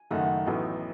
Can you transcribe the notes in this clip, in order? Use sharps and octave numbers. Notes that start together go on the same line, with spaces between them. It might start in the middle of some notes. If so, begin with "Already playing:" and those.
Already playing: G#5
F#1 F#2 D#3 A3 D#4 F#5
A1 A2 F#3 B3 D#4